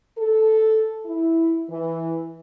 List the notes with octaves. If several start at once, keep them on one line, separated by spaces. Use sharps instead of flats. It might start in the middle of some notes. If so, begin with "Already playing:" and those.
A4
E4
E3